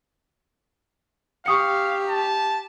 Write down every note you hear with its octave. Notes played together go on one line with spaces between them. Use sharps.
G4 F5 C#6 D#6 C#7
A5